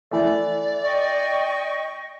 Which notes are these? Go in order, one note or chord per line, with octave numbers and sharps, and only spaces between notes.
E3 A3 D5
D#5 G5 C#6